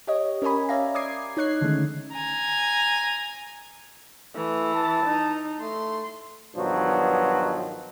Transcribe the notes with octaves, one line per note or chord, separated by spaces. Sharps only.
G4 C#5 D#5
C#4 A#4 C#5 D#5 G#5 B5
C#5 D5 E5 F5 A#5
D6 D#6 G#6 C7
D#4 C#5 F#6 G#6 C7
D3 D#3 G#3 A3 C#4
G#5 A#5
E3 A3
A5
D#4
A3 C6
G2 B2 D#3 F3 F#3